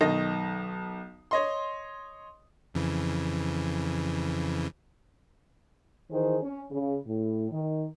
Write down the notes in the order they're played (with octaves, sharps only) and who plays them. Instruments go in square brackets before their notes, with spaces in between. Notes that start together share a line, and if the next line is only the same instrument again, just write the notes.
[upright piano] B1 D#3 D#5 A#6
C#5 D#5 C6
[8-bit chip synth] F2 C#3 E3
[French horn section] D#3 E3 G#4 C5
C#4
C#3
A2
D#3